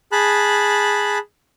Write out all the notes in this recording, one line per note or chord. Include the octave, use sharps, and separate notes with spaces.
G#4 A5 B5 F#6